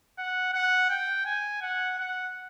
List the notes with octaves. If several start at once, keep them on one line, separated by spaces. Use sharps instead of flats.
F#5
F#5
G5
G#5
F#5
F#5